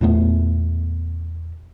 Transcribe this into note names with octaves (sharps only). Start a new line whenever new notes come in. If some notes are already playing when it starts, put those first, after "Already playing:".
E2 A#2 A3 B3